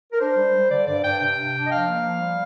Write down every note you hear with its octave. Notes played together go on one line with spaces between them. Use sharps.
A#4
D4 C5
G3
G3
D3 D5
G2 D5
G2 G5
C3 G5
D4
D4
D#5
F3 F5
A#3
F3
G3